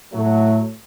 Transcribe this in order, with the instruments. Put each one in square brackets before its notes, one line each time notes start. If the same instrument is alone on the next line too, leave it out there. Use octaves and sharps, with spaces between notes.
[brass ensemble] A2 F#3 A3